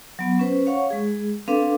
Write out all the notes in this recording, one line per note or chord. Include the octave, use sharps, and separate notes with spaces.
F#3 B3
C#4 B4 C5
C#5 F5 F#5 C#6
G#3 G#4
C4 D4 A4 B4 F5 D6